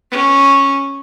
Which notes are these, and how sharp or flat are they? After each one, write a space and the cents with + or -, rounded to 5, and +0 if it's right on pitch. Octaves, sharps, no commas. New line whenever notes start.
C#4 -10